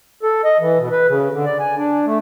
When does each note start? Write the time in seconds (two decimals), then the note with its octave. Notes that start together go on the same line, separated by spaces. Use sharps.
0.23 A4
0.45 D#5
0.60 E3
0.78 B2
0.91 B4
1.09 C#3
1.33 D3
1.45 D5
1.60 G#5
1.78 D4
2.06 A3